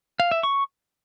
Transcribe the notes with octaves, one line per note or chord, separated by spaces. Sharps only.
F5
E5
C#6